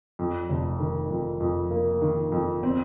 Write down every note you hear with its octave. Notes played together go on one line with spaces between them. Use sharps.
F2
F1
D#3
F2
F2
A#3
D#3
F2
C4